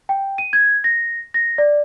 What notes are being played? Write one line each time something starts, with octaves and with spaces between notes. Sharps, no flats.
G5
D#7
G#6
A#6
A#6
D5